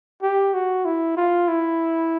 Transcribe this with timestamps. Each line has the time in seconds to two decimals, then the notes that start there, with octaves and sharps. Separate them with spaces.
0.22 G4
0.54 F#4
0.85 E4
1.17 F4
1.48 E4